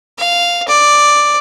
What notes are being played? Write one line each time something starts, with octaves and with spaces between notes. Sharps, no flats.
F5
D5